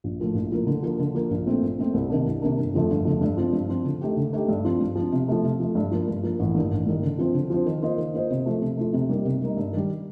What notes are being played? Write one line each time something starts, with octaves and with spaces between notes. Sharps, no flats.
A#1
A2 F3 A#3
A#1
A2 F3 A#3
D3
F3 A#3
D3
F3 A#3
A#1
A#2 A3 C4
A#1
A#2 A3 C4
C2
C3 D#3 A#3 D4
C2
C3 D#3 A#3 D4
G1
F2 D3 F3 A3
G1
F2 D3 F3 A3
G2
F3 C4 F4
G2
F3 C4 F4
D3
A3 D#4 G4
D3
A3 D#4 G4
G2
F3 C4 F4
G2
F3 C4 F4
C3
F3 A3
C3
F3 A3
G2
F3 A#3
G2
F3 A#3
A1
G2 D#3 A#3
A1
G2 D#3 A#3
D3
F3 C4 F4 C5
D3
F3 C4 F4 C5
D#3
A#3 F4 C5 D#5
D#3
A#3 F4 C5 D#5
C3
F3 A3
C3
F3 A3
C3
G3 A#3 D#4
C3
G3 A#3 D#4
G2
D#3 G3